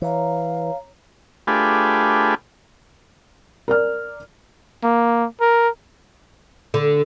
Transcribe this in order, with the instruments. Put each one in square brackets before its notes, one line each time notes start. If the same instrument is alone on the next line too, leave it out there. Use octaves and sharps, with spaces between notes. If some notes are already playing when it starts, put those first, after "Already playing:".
[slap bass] E3 [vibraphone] C#5 A#5 [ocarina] F5
[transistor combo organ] A3 D4 F4 G4 G#4 B4
[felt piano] A#4 D5 F6
[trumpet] A#3
A#4
[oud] D3